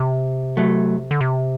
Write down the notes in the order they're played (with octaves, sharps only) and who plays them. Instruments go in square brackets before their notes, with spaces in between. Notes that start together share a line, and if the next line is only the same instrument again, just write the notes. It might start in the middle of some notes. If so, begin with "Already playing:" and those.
Already playing: [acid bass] C3
[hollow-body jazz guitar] F#3 A3
[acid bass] D3
C3